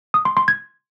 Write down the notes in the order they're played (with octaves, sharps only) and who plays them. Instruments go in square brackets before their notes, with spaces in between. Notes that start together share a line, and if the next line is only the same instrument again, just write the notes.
[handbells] D#6
C6
C6
G#6